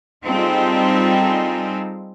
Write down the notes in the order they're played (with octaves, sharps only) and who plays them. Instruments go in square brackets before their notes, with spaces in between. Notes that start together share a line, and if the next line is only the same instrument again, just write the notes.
[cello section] G3 C4 D#4 F4 G#4 A4